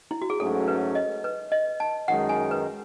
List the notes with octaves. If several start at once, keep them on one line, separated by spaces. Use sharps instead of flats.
E4
F#4
G#4
G#2 F#3 A3 C#4 A4
B4
D#5
B4
D#5
A5
F#2 D#3 G#3 D#4 F#5
G#5
B4